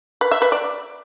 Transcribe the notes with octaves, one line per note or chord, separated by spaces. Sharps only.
B4
E5
B4
D5